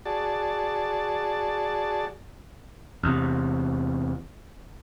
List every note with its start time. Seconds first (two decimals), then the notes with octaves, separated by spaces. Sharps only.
0.05 F#4 G#4 D5 A5
3.03 E2 C3